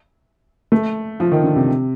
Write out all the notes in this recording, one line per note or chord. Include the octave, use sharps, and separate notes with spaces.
A3
F3
D#3
D3
C3